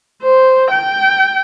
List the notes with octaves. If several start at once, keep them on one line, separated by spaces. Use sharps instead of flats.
C5
G5